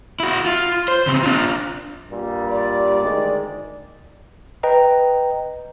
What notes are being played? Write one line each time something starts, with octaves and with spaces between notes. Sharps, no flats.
E4 F#4
F4
C5
C#3 C4
D4 F4
G2 A#2 G3
D5
D2 D#3 G#3
B4 D#5 G5 A#5